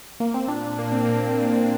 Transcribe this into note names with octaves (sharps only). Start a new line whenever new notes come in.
A#3
C4
A#2 D4
A#2
A#2 A#3
A#2 C4
A#2 A#3
A#2
A#2
A#2